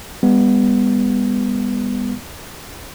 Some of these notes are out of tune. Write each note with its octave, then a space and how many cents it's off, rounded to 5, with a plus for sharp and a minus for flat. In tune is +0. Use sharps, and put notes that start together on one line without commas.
G3 +45 B3 +0